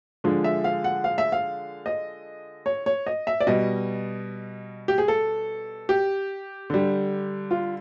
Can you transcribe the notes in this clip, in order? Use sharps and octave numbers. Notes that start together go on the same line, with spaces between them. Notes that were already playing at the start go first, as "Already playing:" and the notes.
D3 F3 G#3
E5
F5
F#5
F5
E5
F5
D#5
C#5
C#5
D#5
E5
D5
B2 G3 D#5
G4
G#4
A4
G4
D3 G3
F4